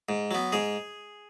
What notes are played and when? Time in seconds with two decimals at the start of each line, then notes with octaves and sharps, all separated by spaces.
0.09 G#2
0.31 F#3 B3
0.52 G#2 G#4